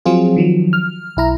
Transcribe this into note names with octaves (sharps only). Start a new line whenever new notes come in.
F3 F#3 C4 F4 G#4
D#3 F3 F#3
F6
B1 E4 A#5